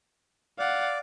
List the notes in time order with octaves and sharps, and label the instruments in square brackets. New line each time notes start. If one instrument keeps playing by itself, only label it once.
[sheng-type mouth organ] D5 [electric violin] F5 F#5